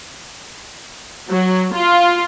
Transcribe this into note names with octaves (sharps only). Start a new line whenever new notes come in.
F#3
F4